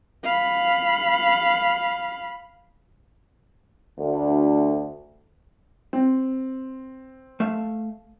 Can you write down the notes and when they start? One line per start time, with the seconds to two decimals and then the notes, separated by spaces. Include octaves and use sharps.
0.24 F5 B5
3.98 D2
5.93 C4
7.40 A3 E5 F5